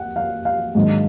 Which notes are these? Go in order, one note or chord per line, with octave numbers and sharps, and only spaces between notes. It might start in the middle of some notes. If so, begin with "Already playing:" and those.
Already playing: F#5
F5
F5
G#2 D#3 F#3 D4